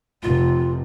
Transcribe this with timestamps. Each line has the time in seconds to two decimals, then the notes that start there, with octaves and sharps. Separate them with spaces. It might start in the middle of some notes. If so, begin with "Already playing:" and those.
0.23 F1 C3 F4